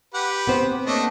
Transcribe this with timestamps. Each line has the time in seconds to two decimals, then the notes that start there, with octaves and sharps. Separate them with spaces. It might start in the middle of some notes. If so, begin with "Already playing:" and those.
0.14 G4 B4 F#5
0.47 B3 C4 C5
0.86 A3 A#3 D4 C#5 D#5 A5